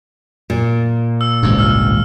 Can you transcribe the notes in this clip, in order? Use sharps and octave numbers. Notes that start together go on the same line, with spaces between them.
A#2
E6
G#1 C#2 G2
E6 F6